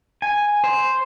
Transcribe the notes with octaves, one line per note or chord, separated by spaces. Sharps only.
G#5
C5